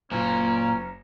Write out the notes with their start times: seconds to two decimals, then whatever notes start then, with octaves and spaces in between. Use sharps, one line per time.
0.12 F#1 A#2 C#4 A#5